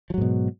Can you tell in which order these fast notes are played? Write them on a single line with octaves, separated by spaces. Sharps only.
F3 F#3 G#2 B2